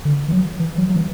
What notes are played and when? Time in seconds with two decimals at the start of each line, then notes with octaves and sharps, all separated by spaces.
0.05 D3
0.28 E3
0.32 F#3
0.60 E3
0.78 F#3
0.90 F#3
0.96 E3